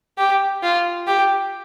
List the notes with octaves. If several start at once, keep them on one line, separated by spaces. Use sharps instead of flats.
G4
F4
G4